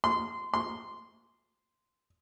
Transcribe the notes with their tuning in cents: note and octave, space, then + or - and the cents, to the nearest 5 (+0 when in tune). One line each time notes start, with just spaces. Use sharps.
C6 -20
C6 -10